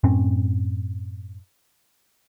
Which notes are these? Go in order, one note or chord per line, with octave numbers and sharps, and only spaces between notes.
F#2 A2 C4 C#4